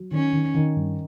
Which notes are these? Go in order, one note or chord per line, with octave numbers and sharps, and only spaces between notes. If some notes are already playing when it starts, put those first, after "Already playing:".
Already playing: F#3
D#3 C#4
D#3
D#3
G2